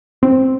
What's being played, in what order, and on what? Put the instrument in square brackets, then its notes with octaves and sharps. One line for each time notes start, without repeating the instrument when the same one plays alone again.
[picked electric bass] C4